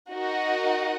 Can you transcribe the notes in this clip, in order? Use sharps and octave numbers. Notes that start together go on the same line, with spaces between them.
D#4 F#4 A#4 D#5 F#5